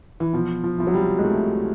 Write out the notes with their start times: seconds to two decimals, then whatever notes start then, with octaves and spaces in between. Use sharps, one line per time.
0.20 E3
0.33 B2 F3
0.64 F3
0.78 C2 F3
0.87 F#3
0.94 G3
1.19 G#3
1.24 C2 A3